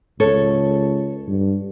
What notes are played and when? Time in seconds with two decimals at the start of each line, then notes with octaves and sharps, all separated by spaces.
0.20 C#2 A4 C#5
1.28 G2